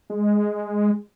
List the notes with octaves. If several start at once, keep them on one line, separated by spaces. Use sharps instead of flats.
G#3